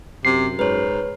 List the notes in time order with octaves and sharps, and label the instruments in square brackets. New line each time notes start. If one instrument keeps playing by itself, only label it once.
[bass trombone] F#2 [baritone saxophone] C3 [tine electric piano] C7
[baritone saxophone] G#2 [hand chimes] B4 C#5